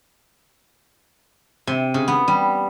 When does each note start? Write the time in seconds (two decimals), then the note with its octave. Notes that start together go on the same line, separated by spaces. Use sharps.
1.67 C3
1.94 C#3
2.08 B3
2.28 G3